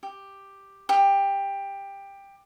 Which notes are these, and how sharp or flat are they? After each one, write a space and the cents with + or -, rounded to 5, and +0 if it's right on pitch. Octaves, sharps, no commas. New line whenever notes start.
G4 +5
G4 +15